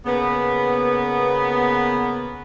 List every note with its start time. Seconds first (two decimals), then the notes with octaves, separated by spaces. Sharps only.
0.06 C#3 A#3 B3